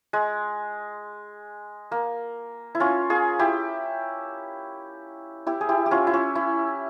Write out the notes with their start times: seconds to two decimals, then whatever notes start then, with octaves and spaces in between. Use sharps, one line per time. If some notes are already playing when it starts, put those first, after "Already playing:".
0.13 G#3
1.92 A#3
2.75 E4
2.80 C#4 F4
3.10 F4 G#4
3.39 E4 G4
5.47 E4 G4
5.61 G#4
5.69 E4 G4
5.86 G4
5.91 C#4 F4
6.07 E4
6.13 C#4
6.35 E4